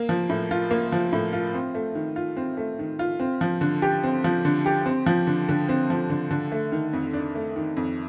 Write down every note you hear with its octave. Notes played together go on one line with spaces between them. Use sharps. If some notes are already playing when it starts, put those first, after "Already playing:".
Already playing: A#3
F3
A2
F4
A#3
F3
A2
F4
C4
A3
D#3
F4
C4
A3
D#3
F4
C4
F3
D3
G4
C4
F3
D3
G4
C4
F3
D3
D3
C4
F3
D3
D3
A3
D#3
F2
D4
A3
D#3
F2